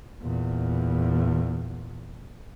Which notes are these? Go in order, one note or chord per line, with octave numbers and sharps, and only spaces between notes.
E2 A#2